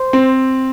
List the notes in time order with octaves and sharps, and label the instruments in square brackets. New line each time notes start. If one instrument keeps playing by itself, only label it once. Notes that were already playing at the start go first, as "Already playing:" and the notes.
Already playing: [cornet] C5
[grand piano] C4